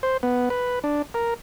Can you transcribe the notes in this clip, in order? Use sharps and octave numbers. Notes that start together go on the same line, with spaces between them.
C5
B3
B4
D4
A#4